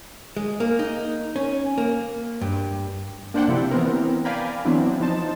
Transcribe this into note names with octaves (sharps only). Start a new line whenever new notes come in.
G#3
A#3
D#4
C#4
A#3
G2
A#3 D4 C5 D5 F#5 G5
C3 F3 E4
E3 B3 C4 A#4
D5 F5 G5 G#5 A#5 B5
E3 F#3 B3 C4 D4 E4
F3 D#4 C5 A5